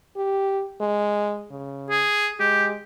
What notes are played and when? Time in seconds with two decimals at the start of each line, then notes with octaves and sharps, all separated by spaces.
0.16 G4
0.81 G#3
1.51 C#3
1.90 G#4
2.40 G#3 G4